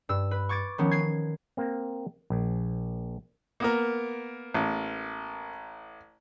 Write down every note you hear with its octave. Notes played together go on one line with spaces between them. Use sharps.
G2 E6
B4
C#6 D6 G#6 A6 D7
D#3 F3 B3 C#4
G#6 C7
A#3 C4
A#1
A#3 B3 A#4
A1